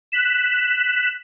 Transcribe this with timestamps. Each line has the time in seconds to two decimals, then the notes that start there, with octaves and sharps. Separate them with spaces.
0.12 F#6 B6 E7